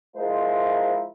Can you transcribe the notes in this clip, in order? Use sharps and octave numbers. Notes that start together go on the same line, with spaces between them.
F3 G#3 E4 A#4 C5